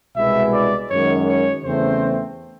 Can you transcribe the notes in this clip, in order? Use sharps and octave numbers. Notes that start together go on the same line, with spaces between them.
C2 B2 G#3 B3 E4 E5
D5
F#2 D#3 G#3 C#5
C#5
E2 C#3 E3 A3 C4 C5